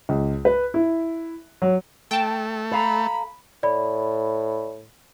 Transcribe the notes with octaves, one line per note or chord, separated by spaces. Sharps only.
C#2
B4
E4
F#3
A3 G5 A5
A4 F5 A#5 B5
A2 D5 B5